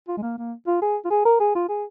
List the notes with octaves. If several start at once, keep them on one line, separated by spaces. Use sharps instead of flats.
F4
G#3
A#3
A#3
F4
G#4
F4
G#4
A#4
G#4
F4
G#4